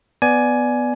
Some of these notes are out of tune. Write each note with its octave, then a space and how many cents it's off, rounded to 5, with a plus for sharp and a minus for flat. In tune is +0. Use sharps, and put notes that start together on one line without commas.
B3 +5 D5 +0 G#5 +15